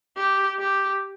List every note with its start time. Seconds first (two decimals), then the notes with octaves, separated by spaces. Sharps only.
0.17 G4
0.60 G4